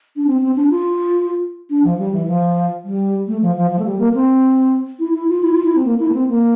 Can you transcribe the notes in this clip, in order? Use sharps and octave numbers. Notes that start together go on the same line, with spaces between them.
D4
C4
C4
D4
F4
D4
F3
G3
E3
F3
G3
A3
F3
F3
F3
A3
G3
A#3
C4
E4
E4
F4
E4
F4
E4
C4
A#3
E4
A#3
C4
A#3